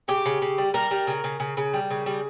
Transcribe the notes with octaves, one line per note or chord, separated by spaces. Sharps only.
C#3 G4
C#3
C#3
G3
G3 A#4
G3
C#3
C#3
C#3
C#3
G3
C#3
G3